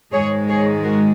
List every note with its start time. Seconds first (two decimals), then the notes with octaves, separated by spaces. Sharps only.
0.12 G#2 D#3 G#3 G#4 C#5
0.48 G#4 C#5
0.83 F#4 A#4